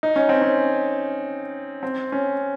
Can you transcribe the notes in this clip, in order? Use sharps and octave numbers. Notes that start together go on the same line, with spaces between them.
D#4
C#4
C4
C#4
C4
C#4